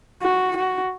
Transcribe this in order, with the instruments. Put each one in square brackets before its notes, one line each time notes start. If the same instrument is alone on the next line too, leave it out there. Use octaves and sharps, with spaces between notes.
[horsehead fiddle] F#4
F#4